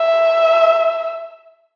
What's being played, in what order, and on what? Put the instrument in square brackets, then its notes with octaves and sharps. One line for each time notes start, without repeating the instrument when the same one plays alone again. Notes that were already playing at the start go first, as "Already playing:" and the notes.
Already playing: [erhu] E5